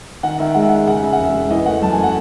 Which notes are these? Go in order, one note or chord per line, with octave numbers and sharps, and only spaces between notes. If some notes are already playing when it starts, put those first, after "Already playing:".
D#3 F#5
D#3 E5
G#3 F#5
E5
G#3 F#5
C#3 F#5
C#3 E5
F#5
E1 E5
E1
E3 D#5
A3 F#5
F#2 A5
G#5
A3
F#5